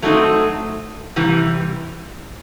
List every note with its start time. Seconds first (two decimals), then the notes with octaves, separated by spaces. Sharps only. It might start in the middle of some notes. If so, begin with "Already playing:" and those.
0.02 F#3 A3 C4 D#4
1.16 C3 E3 G3